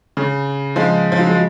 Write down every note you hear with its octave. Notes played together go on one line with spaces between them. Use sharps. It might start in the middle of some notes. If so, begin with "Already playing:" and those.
C#3
F3 G#3
F3
F#3
G#3